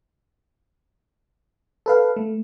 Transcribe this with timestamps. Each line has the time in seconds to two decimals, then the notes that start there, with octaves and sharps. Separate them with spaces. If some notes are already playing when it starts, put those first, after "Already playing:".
1.86 A4 B4 F5
2.17 A3